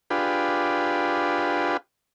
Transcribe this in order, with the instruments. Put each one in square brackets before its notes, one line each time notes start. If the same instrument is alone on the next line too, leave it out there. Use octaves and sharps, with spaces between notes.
[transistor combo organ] D4 F4 G4 G#4 B4